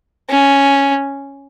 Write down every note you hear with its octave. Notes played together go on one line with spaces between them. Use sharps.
C#4